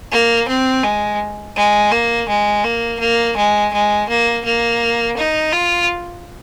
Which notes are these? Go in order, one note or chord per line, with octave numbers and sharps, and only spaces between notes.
A#3
C4
G#3
G#3
A#3
G#3
A#3
A#3
G#3
G#3
A#3
A#3
D#4
F4